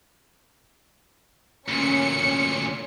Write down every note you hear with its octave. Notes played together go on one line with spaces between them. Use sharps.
D2 A#2 C#4 C#7